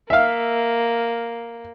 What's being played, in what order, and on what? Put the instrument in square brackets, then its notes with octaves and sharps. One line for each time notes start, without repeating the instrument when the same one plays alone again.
[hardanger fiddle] A#3 [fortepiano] E5 F5